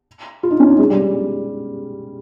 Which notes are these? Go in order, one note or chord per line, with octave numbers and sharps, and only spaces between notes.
F4
D#4
C#4
D#4
G#3
G3